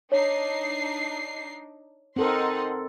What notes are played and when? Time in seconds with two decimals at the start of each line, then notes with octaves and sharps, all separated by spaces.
0.12 D4 D#4 C#5 C7
2.16 C4 D#4 A4 A#4 F#5 C6